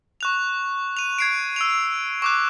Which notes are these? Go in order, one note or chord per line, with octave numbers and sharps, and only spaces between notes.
C#6 F#6 F7
D#7 F7
G#6 C7 D7
E6 D7 F7
C#6 D6 F#6